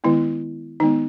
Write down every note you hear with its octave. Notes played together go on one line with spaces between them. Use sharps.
D#3 G#3 B3 E4
D#3 G#3 B3 D#4